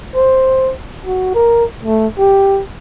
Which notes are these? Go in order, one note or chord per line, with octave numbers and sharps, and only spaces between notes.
C5
F#4
A#4
A3
G4